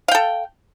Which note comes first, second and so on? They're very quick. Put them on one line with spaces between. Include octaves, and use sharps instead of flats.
F5 G5 A4